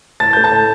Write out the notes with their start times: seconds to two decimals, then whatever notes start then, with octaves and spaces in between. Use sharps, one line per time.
0.20 A2 A5 A6
0.33 A3 G6
0.44 A5 A6
0.52 A2